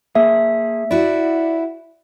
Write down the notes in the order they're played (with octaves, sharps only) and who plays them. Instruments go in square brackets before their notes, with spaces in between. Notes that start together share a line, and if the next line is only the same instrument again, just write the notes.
[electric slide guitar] A#3 G#4 [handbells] E5
[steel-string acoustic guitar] E4 F#4 [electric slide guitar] D5